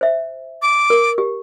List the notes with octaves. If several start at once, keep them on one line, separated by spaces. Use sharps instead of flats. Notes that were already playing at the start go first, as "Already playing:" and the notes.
C5 E5
D6
A#4
G4